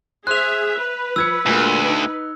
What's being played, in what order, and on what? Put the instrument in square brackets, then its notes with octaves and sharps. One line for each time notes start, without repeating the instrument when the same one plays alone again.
[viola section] G#4 E5 [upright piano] C5 [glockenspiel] F#6 F7
[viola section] B4
[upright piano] F3 G#6 C#7 [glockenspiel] E6
[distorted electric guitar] D2 [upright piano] A#2 G#3 A#3
[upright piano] D#4